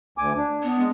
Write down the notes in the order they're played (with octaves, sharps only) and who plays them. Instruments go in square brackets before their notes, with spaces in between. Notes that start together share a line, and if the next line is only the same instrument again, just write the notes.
[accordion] D2 G#5 D6
D4
[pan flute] B3
[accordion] G#3